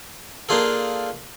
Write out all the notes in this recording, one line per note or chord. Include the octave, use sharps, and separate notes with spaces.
A#3 D4 D#4 F4 G#4 A4